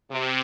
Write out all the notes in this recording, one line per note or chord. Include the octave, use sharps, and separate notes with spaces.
C3